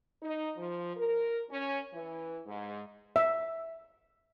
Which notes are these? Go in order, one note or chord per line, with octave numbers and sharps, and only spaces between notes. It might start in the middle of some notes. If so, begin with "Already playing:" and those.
D#4
F3
A#4
C#4
E3
G#2
E5